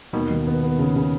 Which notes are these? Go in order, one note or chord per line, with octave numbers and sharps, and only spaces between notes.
D#2 B2 D#3
D#2
B3
B3
C#3
C#3